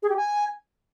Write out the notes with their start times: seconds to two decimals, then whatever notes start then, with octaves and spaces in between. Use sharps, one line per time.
0.03 G#4
0.09 G4
0.16 G#5